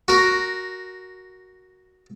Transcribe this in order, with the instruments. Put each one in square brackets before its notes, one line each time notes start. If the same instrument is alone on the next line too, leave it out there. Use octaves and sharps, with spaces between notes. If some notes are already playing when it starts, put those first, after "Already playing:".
[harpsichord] F#4 A#4